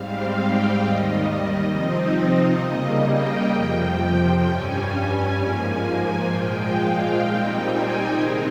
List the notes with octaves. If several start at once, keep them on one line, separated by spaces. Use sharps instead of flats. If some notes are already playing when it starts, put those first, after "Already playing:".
Already playing: G#2 G3 C4 F5
G5
D#2 D#3 G3 D#5
C3 F3 C4 D#4
D#5
C#3 G3 A#3
G5
F2 C3 F3
G2 G3 C#4 G#5
G#5
G#2 F3 A#3 G#5
G#5
A#2 F3 G#3 G5
F5
A#2 G3 C4 D#4 G5
G#5
C3 D#3 G#3 C4 D#4 D#5